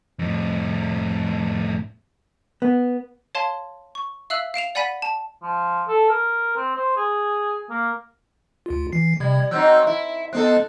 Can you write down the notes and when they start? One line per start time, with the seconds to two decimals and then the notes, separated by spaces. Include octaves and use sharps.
0.19 F2 A2
2.62 B3
3.35 C#5 F5 A5 C6
3.95 C#6
4.30 E5 F5 E6 F#6 F#7
4.54 F5 D7 E7 F7
4.75 D5 F#5 G#5 B5 B6 D#7
5.02 A5
5.43 F3
5.88 A4
6.09 A#4
6.56 C4
6.75 C5
6.96 G#4
7.70 A#3
8.66 D2 F4
8.92 E3 C7
9.20 C3 G3 G#6
9.51 F#3 C4 D#4 E6 F#6 G6
9.87 E4 E5
10.33 B3 C4 D#4 A4 F#6